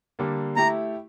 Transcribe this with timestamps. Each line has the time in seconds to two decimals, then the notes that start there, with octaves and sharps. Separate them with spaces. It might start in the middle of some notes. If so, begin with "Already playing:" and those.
0.19 D3 G3 A#3
0.56 A3 E4 G4 A#5